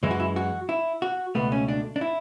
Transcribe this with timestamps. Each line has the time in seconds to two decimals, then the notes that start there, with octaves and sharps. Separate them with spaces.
0.03 F#2 E3 G#3 E4
0.11 F#4
0.20 E4
0.36 F#4
0.69 E4
1.02 F#4
1.35 C#2 B2 A3 B3
1.52 C#4
1.68 D4
1.96 D4
2.01 E4